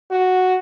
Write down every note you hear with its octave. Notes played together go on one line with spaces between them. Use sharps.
F#4